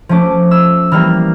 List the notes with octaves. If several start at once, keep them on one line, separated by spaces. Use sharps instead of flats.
F3 A3 C#4 D6
E6
E3 G3 A#3 F6